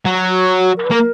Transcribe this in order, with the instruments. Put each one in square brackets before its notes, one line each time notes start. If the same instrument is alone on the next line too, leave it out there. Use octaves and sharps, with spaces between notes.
[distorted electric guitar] F#3
[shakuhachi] F#4
F#4
A#4
B4
[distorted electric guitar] A#3 [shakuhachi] A#4